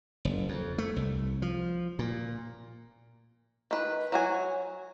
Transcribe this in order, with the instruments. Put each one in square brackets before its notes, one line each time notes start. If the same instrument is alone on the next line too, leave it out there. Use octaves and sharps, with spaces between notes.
[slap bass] F#1
F2
A3
C2
F3
A#2
[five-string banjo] D#3 B4
F#3 F#4 G#5